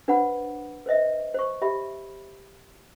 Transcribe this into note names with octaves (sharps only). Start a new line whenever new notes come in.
D4 B4 C5 F#5 B5
B4 C5 D#5 E5
C5 C#6
G4 E5 B5